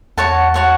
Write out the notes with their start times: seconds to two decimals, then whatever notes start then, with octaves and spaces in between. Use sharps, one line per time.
0.17 E2 F#4 C#5 F#5 A5
0.54 F#4 C#5 F#5 A5